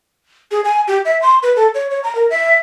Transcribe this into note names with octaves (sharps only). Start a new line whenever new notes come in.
G#4
G#5
G4
E5
C6
B4
A4
C#5
C#5
A#5
A#4
E5